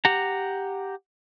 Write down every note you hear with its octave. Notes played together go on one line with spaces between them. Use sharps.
G4 F#5 A#5